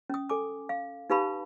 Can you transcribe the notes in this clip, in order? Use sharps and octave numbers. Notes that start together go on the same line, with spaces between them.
C#4 D#6
A4 G#5 D6
F5
D#4 G4 B4 F5 A5 B5